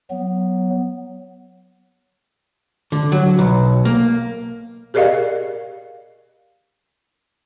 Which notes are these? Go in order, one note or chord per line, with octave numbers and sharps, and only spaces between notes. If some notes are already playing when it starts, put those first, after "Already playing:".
F#3 B3
D3
F#3
B1
A#3
G4 G#4 A#4 D5 D#5 F5